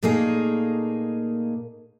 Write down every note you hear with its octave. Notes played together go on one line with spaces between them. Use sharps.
A#2 A3 A#3 D#4 G#4